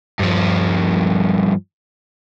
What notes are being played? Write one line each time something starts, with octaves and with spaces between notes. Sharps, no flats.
G2 F3